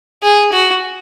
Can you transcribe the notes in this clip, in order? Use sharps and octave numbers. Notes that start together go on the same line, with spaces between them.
G#4
F#4